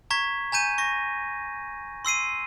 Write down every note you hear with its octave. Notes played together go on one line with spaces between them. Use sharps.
A#5 C#6 G#6 B6
G#5 A#5 G6 D#7
C#6 A#6
C6 E6 C7 D#7